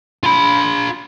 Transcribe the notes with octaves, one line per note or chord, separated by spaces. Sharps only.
F4 B5